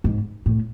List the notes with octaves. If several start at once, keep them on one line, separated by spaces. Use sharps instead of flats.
G#2
A2